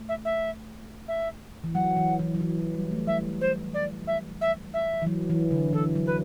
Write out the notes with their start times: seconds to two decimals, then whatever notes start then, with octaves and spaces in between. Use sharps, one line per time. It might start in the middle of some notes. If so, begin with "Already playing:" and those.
Already playing: A3
0.09 E5
0.25 E5
1.08 E5
1.64 E3
1.74 F#3 F#5
1.96 E3
2.19 E3
2.35 F#3
2.41 E3
2.58 F#3
2.74 G3
2.91 A3
3.07 G3 E5
3.41 C5
3.74 D5
4.07 E5
4.41 E5
4.74 E5
5.02 E3
5.06 F#3
5.30 E3
5.51 D3
5.73 E3 A4
5.96 F#3
6.06 B4